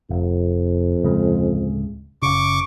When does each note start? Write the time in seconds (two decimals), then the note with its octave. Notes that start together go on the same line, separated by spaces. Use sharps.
0.10 F1 F2
1.04 D1 C#3 G#3
2.22 F#1 C#3 C#6 D6